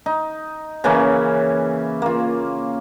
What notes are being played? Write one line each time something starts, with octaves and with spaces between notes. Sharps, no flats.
D#4
C#3 E3 A#3 C#4
A#3 F4